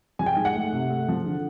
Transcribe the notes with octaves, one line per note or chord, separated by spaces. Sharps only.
F3 G#5
G5
G#2 G#5
F#5
A3
C3
A3
F3
D3